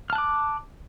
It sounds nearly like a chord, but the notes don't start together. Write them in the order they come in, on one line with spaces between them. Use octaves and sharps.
F6 A5 F#6 D6